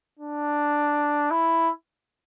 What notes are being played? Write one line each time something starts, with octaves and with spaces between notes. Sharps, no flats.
D4
E4